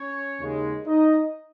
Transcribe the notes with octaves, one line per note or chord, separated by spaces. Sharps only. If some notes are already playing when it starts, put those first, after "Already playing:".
Already playing: C#4 C#5
D#2 C#3 G#3
D#4 D#5